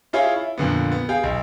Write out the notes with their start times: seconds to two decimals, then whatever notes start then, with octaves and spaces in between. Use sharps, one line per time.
0.13 E4 F4 G#4 C#5
0.36 E4
0.58 F2 A#2 D3 B3
0.92 B3
1.09 G#4 F5 G5
1.23 B1